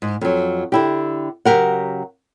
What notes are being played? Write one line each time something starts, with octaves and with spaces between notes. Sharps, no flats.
G#2
F2 F#3
D3 E4 G4
C#3 F#3 G4 A#4 F#5